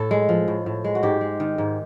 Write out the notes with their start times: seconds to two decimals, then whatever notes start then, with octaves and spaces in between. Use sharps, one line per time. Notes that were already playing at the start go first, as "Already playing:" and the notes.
Already playing: A2 A4
0.11 G#3
0.29 F3
0.48 A2
0.66 A2
0.84 G#3
0.95 F#4
1.03 G#2 G4
1.21 G#3
1.40 D#3
1.58 G#2